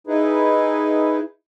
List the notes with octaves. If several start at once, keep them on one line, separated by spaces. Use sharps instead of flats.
D#4 E4 G#4 B4